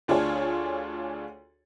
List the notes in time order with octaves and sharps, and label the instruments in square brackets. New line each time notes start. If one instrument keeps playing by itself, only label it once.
[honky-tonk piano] D2 D4 F4 G#4 C#5